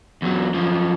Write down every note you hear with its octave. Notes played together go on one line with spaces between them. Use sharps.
E2 F#3
F#2 F3